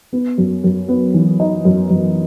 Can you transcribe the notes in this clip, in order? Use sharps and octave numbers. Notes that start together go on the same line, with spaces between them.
B3
F#2
F#2
B3
E3
D#4
F#2
F#2